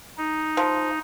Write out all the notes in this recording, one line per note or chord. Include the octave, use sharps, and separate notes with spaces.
D#4
F3